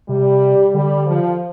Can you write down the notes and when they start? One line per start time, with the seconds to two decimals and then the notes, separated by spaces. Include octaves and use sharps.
0.09 C3 G3
0.74 D3 G3
1.06 F3